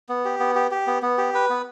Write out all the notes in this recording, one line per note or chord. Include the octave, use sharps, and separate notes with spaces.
B3
G4
B3
G4
G4
B3
B3
G4
B4
B3